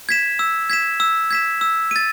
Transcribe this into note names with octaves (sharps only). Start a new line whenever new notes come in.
G#6 B6 E7
E6
G#6 B6 E7
E6
G#6 B6 E7
E6
A6 D#7